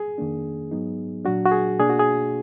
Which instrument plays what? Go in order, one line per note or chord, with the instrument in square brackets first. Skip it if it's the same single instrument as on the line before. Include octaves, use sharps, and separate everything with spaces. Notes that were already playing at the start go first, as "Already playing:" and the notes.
Already playing: [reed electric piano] G#4
F2 D#3 A#3 D4
G#2 F#3 B3 D#4
A#2 F#3 D4 F#4
F#4
G#4
B2 A#3 D4 G#4
F#4
G#4